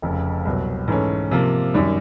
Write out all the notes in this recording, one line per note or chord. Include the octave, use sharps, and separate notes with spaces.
F1 F2 C#3
C2 B2 F#3
G#2 E3 A3 C#4
C3 F3 A#3
F#2 D#3 G3